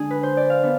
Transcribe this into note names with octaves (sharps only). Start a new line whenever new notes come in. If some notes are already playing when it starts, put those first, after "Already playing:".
Already playing: D3 G#3 D4 G#4
B4
C5
D5
F5
B3 D4